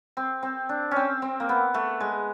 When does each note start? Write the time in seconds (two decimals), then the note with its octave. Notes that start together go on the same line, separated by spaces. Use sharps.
0.17 C4
0.43 C4
0.69 D4
0.91 C4 C#4
1.22 C4
1.40 A#3
1.49 B3
1.74 A3
2.00 G#3